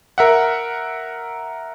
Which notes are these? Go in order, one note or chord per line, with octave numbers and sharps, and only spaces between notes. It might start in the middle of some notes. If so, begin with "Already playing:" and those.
A#4 E5 F#5